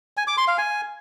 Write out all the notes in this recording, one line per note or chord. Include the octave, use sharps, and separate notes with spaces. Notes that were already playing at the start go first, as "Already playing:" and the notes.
G#5
D6
C6
F5
G#5